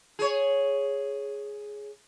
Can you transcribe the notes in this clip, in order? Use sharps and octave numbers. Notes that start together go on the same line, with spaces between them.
G#4 C#5